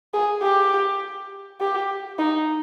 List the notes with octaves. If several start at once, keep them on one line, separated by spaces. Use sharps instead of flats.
G#4
G4
G4
D#4